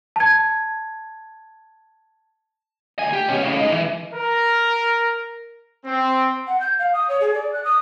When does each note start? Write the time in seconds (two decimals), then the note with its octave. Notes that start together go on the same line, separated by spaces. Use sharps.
0.16 A5 G#6
2.99 D2 G#5
3.13 G4
3.28 B2 C#4
3.43 A2 C#3
3.58 G#3 D#4
3.72 E3
4.13 A#4
5.85 C4
6.47 F#5
6.60 G6
6.79 F5
6.93 D#6
7.09 C#5
7.20 G#4
7.34 D5
7.53 F#6
7.64 D#6